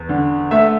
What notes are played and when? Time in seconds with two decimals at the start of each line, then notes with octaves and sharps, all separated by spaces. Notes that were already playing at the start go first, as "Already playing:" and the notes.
Already playing: E2
0.09 D3
0.51 A3 E5